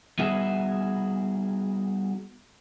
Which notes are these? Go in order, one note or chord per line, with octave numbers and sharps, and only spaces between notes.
G3 B3 D#4 F#4 G#4 E5